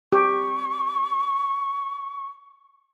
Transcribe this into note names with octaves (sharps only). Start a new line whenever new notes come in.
G4 C#6